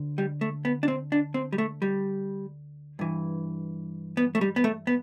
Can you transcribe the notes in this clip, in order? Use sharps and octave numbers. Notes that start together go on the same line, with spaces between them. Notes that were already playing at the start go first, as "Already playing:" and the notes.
Already playing: D2 D3
G3
A3
B3
D4
C4
D4
C4
G3
A3
G3
G2 E3
B3
A3
G3
B3
A3
B3